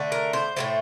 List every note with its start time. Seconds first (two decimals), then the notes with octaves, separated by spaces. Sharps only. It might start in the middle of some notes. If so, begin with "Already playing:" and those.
Already playing: D3 A3
0.12 A#4
0.33 C5
0.56 A2 E3 A3 C5